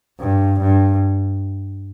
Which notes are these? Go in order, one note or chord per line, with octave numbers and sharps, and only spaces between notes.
G2
G2